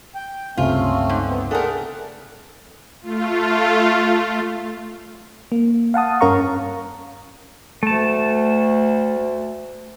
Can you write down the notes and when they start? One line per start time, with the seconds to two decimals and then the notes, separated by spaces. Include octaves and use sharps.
0.15 G5
0.57 G1 C#2 C3 A3 C4 C#4 F4
1.09 G#2
1.29 B3 C4
1.51 A3 D4 G#4 A#4 F#5
3.02 A3 F4
5.52 A#3
5.94 F5 F#5 A5 D#6
6.21 G2 C#4 A#4 F5 A#5 C#6
7.83 D2 A3 A5